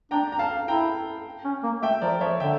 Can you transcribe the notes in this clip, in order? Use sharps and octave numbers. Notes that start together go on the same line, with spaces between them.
D4 G5 A#5
A#5
F5 A5
E4 G5 A#5
C#4
A#3
A3 E5 G5
F3 A#4 D5
F3 C#5 E5
D3 E5 G5